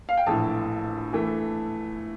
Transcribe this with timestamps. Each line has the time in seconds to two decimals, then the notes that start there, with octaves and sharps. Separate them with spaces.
0.09 F5
0.17 G5
0.27 A#1 A2 E3 A5
1.13 E3 A3